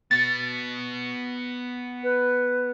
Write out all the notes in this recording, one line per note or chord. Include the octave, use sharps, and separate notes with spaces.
B3 F#4 A6
B4